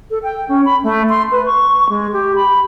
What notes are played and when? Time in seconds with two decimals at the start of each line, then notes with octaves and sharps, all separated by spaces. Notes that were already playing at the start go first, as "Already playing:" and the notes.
0.10 A4
0.23 G5
0.49 C#4
0.65 B5
0.83 A3
1.09 C6
1.31 B4
1.46 C#6
1.89 G#3
2.13 G4
2.36 B5